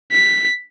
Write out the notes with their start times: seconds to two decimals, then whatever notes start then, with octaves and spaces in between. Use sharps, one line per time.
0.12 B6